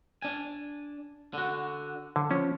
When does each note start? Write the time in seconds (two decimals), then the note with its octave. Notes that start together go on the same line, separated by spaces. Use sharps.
0.22 D4 G#5
1.33 D3 F#4
2.16 D3
2.31 F3 C#4